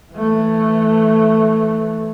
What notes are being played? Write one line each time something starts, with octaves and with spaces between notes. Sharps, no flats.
E3 A3